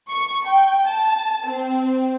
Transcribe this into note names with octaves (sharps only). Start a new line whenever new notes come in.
C#6
G5
A5
C4